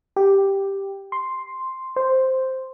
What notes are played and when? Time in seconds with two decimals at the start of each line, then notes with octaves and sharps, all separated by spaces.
0.16 G4
1.12 C6
1.96 C5